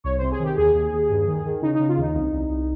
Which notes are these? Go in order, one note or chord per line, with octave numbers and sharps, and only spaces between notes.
C2 C#5
C3 C5
G#4
D#3 G4
D#2 G#4
D#2
D#2
G2
D#3
D#3
C#3 D#4
C#3 D#4
F4
D#2 D#4
C2
C2
C2